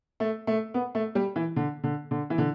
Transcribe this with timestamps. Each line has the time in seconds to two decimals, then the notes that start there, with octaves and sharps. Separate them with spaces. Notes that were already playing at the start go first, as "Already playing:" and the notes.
0.20 A3
0.47 A3
0.74 B3
0.95 A3
1.15 G3
1.36 E3
1.56 D3
1.84 D3
2.11 D3
2.30 E3
2.38 D3